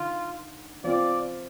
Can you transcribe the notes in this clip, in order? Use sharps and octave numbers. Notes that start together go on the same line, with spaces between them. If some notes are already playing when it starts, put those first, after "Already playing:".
Already playing: D3 D#4 F4
F3 C4 F4 D5